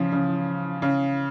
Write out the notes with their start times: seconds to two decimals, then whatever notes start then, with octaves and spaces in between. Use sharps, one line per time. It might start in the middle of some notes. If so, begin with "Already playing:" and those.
Already playing: C#3 F3
0.12 C#3
0.82 C#3